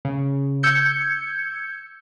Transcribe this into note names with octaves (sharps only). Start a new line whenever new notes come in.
C#3
E6 G6 G#6 C#7